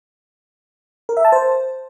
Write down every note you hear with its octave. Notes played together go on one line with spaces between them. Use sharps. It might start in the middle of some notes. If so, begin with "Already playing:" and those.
A#4
E5
A5
C5